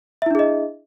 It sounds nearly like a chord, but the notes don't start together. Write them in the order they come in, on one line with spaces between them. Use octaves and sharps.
E5 E4 D4 G#4 D#5